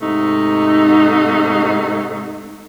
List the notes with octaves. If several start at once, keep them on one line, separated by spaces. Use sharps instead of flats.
G#2 C3 A3 D#4